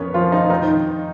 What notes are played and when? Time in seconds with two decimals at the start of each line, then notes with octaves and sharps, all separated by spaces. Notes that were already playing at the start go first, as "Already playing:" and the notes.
Already playing: F2 B3 C#4 A#4 B4 C#5
0.14 F3 F4
0.32 D#3 D#4
0.50 F2 D#3 D#4